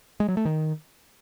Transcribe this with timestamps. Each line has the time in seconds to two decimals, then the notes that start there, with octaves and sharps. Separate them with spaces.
0.20 G#3
0.28 F#3
0.37 A3
0.45 D#3